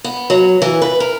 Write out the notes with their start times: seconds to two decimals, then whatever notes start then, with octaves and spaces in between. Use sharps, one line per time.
0.04 B3
0.30 F#3
0.62 E3
0.82 B4
1.00 A#4